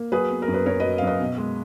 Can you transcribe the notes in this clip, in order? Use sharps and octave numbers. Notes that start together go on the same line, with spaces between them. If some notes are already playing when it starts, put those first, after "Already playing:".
Already playing: A#3
F#3 G#4 B4
B3
A#4
F#2
B4
F#2 A#4 C#5
B4 D#5
F#3
F5
F#2 B4 D#5
B2
G#3